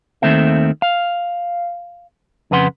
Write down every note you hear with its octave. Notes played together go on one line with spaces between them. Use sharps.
D#2 D#3 A3 C4 E5
F5
F2 C#3 B4 F#5 C6